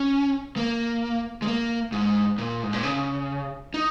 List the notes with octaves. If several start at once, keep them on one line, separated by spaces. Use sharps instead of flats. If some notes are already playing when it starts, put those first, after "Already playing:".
Already playing: C#4
A#3
G#3
A#3
G#2
A#2
G#2
A#2
C#3
D#4